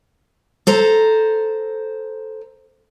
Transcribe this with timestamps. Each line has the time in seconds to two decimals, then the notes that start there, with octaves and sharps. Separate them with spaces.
0.67 A4 C5 A#5